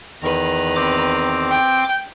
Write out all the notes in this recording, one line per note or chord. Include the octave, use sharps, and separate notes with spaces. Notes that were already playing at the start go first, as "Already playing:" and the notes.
E2 D#3 B4 A#5
C4 D6
G5